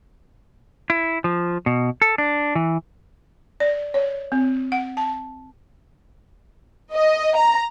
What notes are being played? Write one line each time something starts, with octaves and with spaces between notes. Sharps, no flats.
E4
F3
B2
A4
D4
E3
D5
C#5
C4
F#5
A5
D#5
A#5